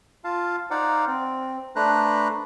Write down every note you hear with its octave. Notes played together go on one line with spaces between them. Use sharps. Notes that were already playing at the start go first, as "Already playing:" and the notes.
F4 F5 A5
D#4 C5 D5 F5 F#5
C4
A3 D4 B4 C5 A#5 F#6